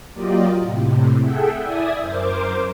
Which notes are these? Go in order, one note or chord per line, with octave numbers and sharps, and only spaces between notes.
F#3 A#3 F4 G4 D5 D#5
A2 C3
G#4 A4 E5 F#5 G5
E4 D5 E5 G#5 D#6
F#2 A#4 C5 D6